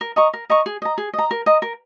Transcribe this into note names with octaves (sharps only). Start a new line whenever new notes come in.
A#4
D#5 A#5 C#6
A#4
D#5 A#5 C#6
G#4
D#5 A#5
G#4
D#5 A#5
A#4
D#5 A#5
A#4